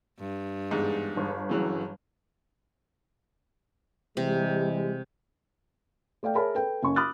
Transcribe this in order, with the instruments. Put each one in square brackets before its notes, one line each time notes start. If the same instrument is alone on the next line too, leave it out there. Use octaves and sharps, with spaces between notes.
[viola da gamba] G2
[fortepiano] E2 G#2
[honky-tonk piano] G1
[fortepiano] C#3 E3 F#3
[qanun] C3 [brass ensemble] E3 G3 G#3
[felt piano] A3 D5 F5 G5
G#4 A#4 C#5 E5 A5 B5
A4 B4 G5
F#1 C#4 C#6
B5 D6 D#6 F6 F#6 A6